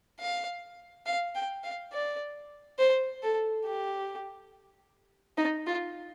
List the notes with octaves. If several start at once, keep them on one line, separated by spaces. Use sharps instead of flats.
F5
F5
G5
F5
D5
C5
A4
G4
D#4
F4